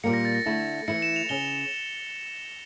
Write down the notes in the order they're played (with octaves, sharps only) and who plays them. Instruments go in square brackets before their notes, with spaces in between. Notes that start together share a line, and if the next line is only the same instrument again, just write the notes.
[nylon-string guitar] A#2 G3 A#3 [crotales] C#7
[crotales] A#6
A6
A#6
[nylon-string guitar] D3 A3 E4
[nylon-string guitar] E3 A3 E4 [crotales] C#7
[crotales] E7
F7
[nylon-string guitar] C#3 C#4 [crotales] G7